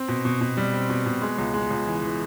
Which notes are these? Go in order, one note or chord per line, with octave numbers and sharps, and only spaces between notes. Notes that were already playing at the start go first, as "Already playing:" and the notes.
Already playing: C4
B2
B2
B2
G3
C4
B2
B2
G#3
C#2
G#3
C#2
E3
E3